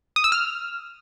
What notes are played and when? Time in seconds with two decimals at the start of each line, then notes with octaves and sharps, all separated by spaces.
0.16 D#6
0.24 E6
0.32 F6